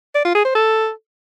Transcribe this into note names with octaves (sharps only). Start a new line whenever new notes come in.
D5
F4
G#4
C5
A4